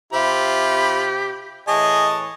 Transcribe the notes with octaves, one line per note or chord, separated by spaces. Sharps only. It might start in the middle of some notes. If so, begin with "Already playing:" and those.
C3 F4 G4 B5
A2 E3 G#4 C#5 D#5 A5